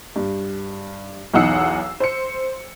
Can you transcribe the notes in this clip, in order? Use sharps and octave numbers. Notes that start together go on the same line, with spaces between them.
G2
B1 E2 D#4 F#5 E6 C7
C5 C#7